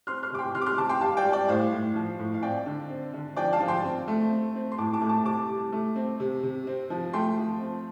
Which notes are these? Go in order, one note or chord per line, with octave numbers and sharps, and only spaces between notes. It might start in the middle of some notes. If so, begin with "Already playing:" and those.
C4 C6 F6
C6 F6
C3 D6
G5 C6
C3 C6 F6
D6
C6 F6
C3 A5 D6
G5 C6
G3 F5 A5
D5 G5
G3
D5 G5
A2 C5 F5
A2
F3
A2
F5
C4 D5 G5
D3
C4
D3
F3 D5 G5
F5 A5
F3
G5 C6
C4
A3
C4
C4
C6
A2 A5 D6
A5 D6
A3
A5 D6
C3 A5 D6
G3
A3
C4
C3
C3
C4
F3
A3 G5 C6
F3
C4